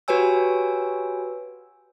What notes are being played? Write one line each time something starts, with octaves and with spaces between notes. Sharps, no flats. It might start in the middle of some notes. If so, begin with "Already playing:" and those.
F#4 G4 B4 C#5 G#5 E6